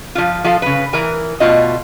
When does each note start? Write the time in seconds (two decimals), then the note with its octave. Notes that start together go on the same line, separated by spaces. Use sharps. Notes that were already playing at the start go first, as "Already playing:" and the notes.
0.15 F3 F4
0.44 F3 F4 A4 F5
0.62 C#3 B4
0.93 E3 A#4 G#5
1.40 B2 A3 F4 D#5